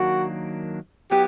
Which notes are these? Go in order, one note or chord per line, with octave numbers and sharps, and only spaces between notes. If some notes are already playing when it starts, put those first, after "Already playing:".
Already playing: D#3 F#3 A#3 D4 F#4
F#3 B3 E4 G4